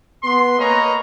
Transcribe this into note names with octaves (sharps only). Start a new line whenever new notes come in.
B3 C6
A#3 G#4 B4 C#5 D#5 A#5